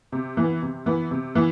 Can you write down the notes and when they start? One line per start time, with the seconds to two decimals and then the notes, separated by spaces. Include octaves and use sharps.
0.12 C3
0.37 E3
0.42 B3
0.62 C3
0.86 E3 B3
1.11 C3
1.35 E3 B3